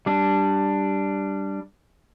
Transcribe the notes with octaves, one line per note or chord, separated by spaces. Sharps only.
G3 D4